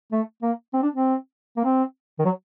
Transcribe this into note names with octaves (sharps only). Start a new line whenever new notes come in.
A3
A#3
C4
D4
C4
A#3
C4
D#3
F#3